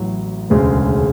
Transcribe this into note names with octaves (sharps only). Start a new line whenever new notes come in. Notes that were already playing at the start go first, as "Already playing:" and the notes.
Already playing: A1 A2 F#3
E1 D2 C#3 G#3